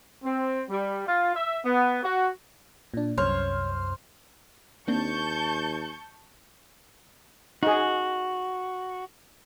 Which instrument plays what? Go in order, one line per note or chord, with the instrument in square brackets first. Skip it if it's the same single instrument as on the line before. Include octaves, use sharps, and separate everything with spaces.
[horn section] C4
G3
F4
E5
B3
F#4
[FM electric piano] A#2 D4
[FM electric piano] C2 F#2 F6 [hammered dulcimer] C5 [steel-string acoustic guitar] C#5
[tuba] D#2 [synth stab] A#3 C4 D4 [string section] A5 C#6 G6
[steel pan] D#4 G#4 [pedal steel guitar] F#4